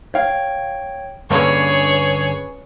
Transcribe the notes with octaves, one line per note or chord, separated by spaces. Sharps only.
C#5 F5 G5 G#6
G2 D3 A#3 C#4 G#4 B4 C#5 C#6